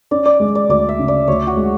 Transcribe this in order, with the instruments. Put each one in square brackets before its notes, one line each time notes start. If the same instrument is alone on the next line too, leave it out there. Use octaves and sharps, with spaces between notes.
[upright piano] C#4 [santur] D5
[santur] D5
[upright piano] G#3
[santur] D5
[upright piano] D2 [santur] D5
[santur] E5
[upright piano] C#3
[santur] D5
[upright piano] D2 [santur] C#5
[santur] F#4
[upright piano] G#3